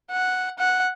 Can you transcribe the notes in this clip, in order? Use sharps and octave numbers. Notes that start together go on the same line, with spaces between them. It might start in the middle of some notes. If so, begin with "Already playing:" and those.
F#5
F#5